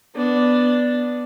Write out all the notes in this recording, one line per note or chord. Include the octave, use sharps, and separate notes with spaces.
B3 D4